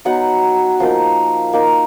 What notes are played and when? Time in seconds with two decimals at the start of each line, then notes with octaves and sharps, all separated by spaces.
0.05 F#3 B3 D#4 F#5
0.80 F3 A#3 D#4 F5
1.53 A#3 D#4